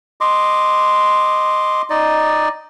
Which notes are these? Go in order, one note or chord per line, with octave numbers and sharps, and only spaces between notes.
D#5 C6 D6
D#4 D5 D#5